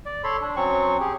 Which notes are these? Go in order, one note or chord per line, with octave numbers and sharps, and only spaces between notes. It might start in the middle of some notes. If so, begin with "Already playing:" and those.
D5
A4 C#5 B5 C6
D4
F#3 C4 C#4 C#6
G4 G#4